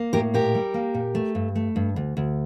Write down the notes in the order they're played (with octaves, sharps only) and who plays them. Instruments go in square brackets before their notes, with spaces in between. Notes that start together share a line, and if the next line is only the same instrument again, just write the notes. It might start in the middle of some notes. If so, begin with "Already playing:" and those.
Already playing: [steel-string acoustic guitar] A#3
A2 G4 A#4
A#2 G4 A#4
G3
A#3
A#2
A3
G2
A3
G2
D2
D2